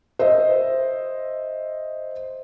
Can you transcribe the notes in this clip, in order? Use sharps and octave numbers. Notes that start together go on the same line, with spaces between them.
C5 D#5 E5